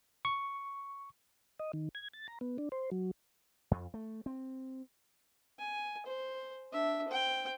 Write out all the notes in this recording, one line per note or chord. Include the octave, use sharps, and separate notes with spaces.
C#6
D#5
D#3
G#6
A6
A#5
B3
D4
C5
F#3
F2
A3
C4
G#5
C5
D4 E5
C5 G5